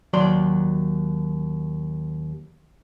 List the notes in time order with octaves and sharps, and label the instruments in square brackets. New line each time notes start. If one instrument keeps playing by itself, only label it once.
[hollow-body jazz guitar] D#2 F#3 D5 A#5 C6